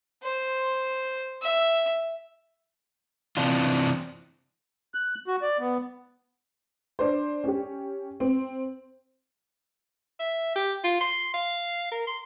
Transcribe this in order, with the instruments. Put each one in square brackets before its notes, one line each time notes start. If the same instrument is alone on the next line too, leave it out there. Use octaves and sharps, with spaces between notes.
[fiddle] C5
E5
[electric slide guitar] C3 E3 C4 D4 F4
[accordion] F#6
F#4
D5
B3
[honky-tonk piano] D4 C5
C#4 G4
C4
[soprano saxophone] E5
G4
F4
C6
F5
A#4
C6